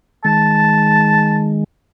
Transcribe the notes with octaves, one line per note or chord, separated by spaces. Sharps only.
D#3 G#3 A5